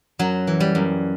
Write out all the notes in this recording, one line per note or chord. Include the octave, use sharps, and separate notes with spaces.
F#2 F#3
E3
G3
F#2